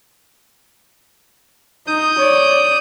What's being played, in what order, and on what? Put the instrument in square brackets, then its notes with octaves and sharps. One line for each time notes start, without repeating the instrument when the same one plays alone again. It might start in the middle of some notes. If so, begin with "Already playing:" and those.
[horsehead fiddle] D#4 [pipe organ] D#6 G6
[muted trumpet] C#5 [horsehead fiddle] D5